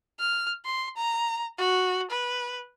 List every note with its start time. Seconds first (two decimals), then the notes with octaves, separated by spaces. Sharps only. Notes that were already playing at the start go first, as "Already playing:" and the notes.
0.20 F6
0.65 C6
0.97 A#5
1.58 F#4
2.11 B4